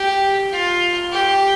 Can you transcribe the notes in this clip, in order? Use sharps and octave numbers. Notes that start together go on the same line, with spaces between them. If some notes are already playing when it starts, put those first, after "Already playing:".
Already playing: G4
F4
G4